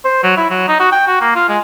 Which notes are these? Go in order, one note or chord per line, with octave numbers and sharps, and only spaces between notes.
C5
F#3
E4
F#3
D#4
F#4
G5
F#4
A#3
F4
G#3